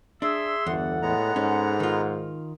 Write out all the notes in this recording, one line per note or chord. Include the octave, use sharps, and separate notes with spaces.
D4 G#4 E5 C6 E6
G1 E2 A4 F#5
A2 G#3 B3 A#5
G#2 C#4
D#3 F4